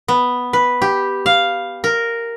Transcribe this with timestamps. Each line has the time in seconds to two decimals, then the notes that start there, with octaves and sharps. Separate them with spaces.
0.08 B3
0.53 B4
0.82 G4
1.26 F5
1.84 A#4